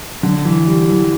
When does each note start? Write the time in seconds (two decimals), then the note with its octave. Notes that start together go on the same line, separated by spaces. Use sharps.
0.23 D3
0.45 E3
0.67 G3
0.89 E3